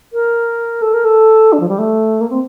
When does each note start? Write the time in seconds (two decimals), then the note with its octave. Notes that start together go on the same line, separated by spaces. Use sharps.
0.13 A#4
0.82 A4
0.93 A#4
1.04 A4
1.52 D4
1.60 F3
1.69 G3
1.79 A3
2.21 A#3
2.30 C4